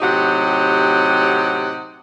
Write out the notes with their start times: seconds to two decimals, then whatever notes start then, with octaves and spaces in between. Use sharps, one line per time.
0.01 A2 C3 F#3 D#4 G4 F#5